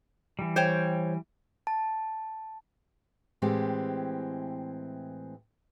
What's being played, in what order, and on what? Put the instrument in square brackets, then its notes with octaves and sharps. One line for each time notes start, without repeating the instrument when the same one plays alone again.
[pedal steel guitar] E3 G3
[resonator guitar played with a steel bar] C5 C#5 G5
[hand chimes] A5
[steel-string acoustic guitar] A2 E3 G#3 C4 G4